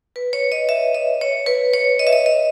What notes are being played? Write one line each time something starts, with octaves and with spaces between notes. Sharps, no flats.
B4
C#5
D#5
E5
D#5
C#5
B4
C#5
D#5
E5
D#5
D#5